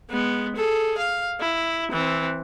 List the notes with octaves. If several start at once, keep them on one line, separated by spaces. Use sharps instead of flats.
G#3 B3
G#4 A4
F5
E4
E3 C4